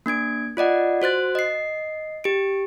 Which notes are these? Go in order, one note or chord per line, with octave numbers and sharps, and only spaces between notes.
A#3 D4 G#6 D7
F4 D5 D#5 F#5
F#4 C5 F#6 A6
D#5 C7
G4 D7